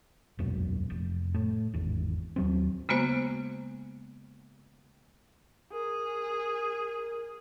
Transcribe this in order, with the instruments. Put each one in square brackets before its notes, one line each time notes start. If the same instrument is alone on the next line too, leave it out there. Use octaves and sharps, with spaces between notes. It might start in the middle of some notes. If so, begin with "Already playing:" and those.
[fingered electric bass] E1 B1 F#2 A#2
F1
A2
G#1 E2
D#2 F#3 C4
[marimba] C#3 G#3 A#3 B3 F#4 C5
[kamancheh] G#4 [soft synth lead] A#4